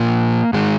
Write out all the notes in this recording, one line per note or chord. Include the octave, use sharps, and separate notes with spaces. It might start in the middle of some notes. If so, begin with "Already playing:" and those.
Already playing: A#2 F3 A#3
G#2 D#3 G#3